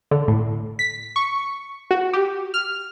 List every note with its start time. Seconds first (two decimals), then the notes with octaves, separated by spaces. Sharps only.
0.11 D3
0.28 A2
0.79 B6
1.16 C#6
1.91 F#4
2.13 G4
2.54 F6